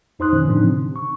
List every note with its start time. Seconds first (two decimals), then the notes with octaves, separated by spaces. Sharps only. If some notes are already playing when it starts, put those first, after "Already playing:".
0.19 F2 D#4 C5 C6 D#6 F#6
0.33 B2 D#3 E3 C#4
0.46 A2 D3 F3 C4 D4 D#4
0.64 C3
0.96 C#6